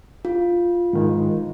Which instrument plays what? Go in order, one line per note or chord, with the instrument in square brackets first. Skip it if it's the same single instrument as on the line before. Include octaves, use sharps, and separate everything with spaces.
[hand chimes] F4
[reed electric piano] G#2 D#3 G#3